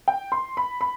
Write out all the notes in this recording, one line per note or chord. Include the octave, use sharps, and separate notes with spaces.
G5
C6
B5
B5